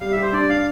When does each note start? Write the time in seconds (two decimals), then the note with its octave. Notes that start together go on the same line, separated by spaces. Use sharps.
0.01 G3 F5
0.12 G4 E5
0.22 C5
0.32 D4 D5
0.49 D4 F5